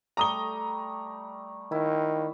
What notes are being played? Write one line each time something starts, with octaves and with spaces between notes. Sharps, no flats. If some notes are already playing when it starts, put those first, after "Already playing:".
G3 A3 A#5 C#6 D#6 G7
D#3 E4